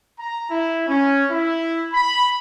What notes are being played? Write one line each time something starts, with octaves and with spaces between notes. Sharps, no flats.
A#5
E4
C#4
E4
B5